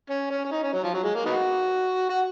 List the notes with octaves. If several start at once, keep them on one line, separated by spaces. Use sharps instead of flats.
C#4
C#4
C#4
D#4
C#4
F#3
F3
F#3
G#3
A#3
B3 D#4 F#4
F#4